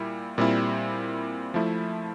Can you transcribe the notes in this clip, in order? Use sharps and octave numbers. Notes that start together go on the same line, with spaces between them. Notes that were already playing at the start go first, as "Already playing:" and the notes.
Already playing: A#2 G3 E4
A#2 G3 C4 E4
F3 A3 E4